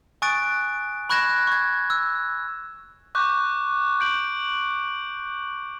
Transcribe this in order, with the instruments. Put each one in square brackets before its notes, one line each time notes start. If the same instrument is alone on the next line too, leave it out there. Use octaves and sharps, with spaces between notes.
[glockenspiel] G#5 C#6 D#6 F#6 A6 D7
B5 C#6 F#6 G#6 A#6 E7
C#6 G#6
E6 F#6
[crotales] C#6 D6 F#6 G6
G6 D7 F#7